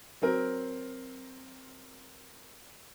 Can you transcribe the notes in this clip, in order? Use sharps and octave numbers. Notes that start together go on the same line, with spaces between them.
F#3 C4 A#4